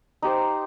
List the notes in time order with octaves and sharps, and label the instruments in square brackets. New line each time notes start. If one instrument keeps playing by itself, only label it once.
[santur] D#4 G4 C5